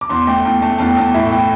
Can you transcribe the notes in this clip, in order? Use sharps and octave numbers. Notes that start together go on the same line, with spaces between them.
D6
E2 C6
A3 G5
E2 G5
A3 A5
E2 A5
G5
E2
A2 E5
A2 G5